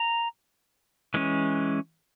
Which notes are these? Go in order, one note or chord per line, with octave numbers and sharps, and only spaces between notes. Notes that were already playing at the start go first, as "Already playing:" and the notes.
Already playing: A#5
E3 G#3 C#4